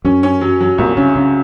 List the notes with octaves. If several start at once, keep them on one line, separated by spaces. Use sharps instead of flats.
F#2 C#4
C#4
F#3
F#3
C2 A#2
C#3 C#4
C#3 C#4